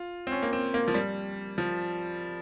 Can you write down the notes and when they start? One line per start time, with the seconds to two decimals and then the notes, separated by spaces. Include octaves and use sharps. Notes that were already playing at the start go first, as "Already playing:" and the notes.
Already playing: F4
0.27 C4
0.32 C#4
0.43 A#3
0.53 C4
0.74 A#3
0.88 F3
0.94 G3
1.58 F3